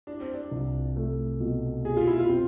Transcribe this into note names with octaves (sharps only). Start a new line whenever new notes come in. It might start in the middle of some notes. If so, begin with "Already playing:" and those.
D4 E4
C4
D4
C2
A3
B2
B2 G#4
F4
E4
F4
C4